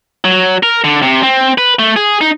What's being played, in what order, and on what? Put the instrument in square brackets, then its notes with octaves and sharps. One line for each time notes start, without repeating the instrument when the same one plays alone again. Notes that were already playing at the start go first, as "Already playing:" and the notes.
[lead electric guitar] F#3
A#4
D3
C3
C4
B4
A3
G#4
D#4